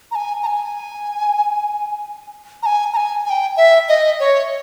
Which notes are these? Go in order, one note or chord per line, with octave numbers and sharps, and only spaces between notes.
A#5
G#5
A#5
G#5
A#5
G#5
A#5
G#5
G#5
G5
E5
D#5
C#5